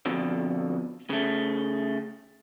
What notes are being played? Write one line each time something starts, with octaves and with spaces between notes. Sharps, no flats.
F2 B2 D3
C#3 A3